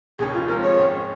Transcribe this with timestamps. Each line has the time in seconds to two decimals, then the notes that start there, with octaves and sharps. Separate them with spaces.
0.19 F1 D#2 D#3 C#4 G#4
0.34 F4
0.48 F2 F3 G#3 F4 A#4
0.62 C#5
0.77 G#1 G#2 G#3 C#4